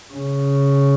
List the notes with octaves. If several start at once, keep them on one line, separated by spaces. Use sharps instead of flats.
C#3